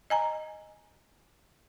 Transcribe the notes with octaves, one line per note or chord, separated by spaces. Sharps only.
D#5 G#5 A#5